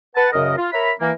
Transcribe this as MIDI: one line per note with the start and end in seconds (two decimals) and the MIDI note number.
0.15 0.27 71
0.15 0.27 78
0.15 0.27 81
0.32 0.56 42
0.32 0.56 49
0.32 0.56 70
0.32 0.56 75
0.57 0.67 65
0.72 0.91 70
0.72 0.91 73
0.72 0.91 76
0.72 0.91 82
0.72 0.91 83
1.00 1.11 52
1.00 1.11 58